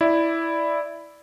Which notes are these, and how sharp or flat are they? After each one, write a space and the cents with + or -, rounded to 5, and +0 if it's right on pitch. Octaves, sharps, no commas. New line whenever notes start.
E4 +0 D5 +0